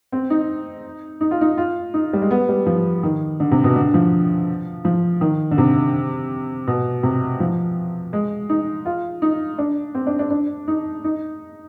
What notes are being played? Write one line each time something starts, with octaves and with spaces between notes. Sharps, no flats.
C4
D#4
D#4
F4
D#4
F4
D#4
G3
G#3
B3
G3
F3
D#3
D3
C3
B2
D3
F3
F3
D#3
D3
C3
B2
C3
F3
G#3
D#4
F4
D#4
D4
C4
D4
D4
D4
D#4
D#4